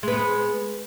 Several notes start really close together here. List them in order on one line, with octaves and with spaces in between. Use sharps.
G#3 B4 B3